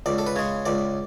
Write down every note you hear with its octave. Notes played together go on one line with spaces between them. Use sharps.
C#2 D5
A4
B4
C#3 G#3 C#5
C#2 D5